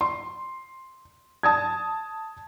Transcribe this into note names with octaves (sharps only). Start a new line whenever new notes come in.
C6
A5 D#6 G#6